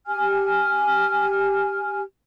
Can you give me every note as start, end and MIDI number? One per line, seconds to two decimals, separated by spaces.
0.07 2.01 67
0.07 2.01 80
0.07 2.01 89